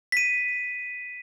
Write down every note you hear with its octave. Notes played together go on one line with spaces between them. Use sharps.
B6 D#7